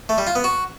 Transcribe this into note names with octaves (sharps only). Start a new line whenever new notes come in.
A3
G3
F4
B3
F#4